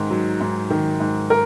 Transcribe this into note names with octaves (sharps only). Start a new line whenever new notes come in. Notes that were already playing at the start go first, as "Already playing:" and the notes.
Already playing: G#2 D#3
F#3
G#2
D#3
G#2
A#4